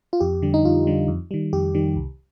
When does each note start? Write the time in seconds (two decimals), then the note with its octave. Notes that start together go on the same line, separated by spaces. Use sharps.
0.13 F4
0.20 F2 G4
0.42 D3 G3
0.54 D#4
0.65 F2 F4
0.87 D3 G3
1.08 F2
1.31 D#3 G3
1.53 F2 G4
1.75 D#3 G3
1.96 C2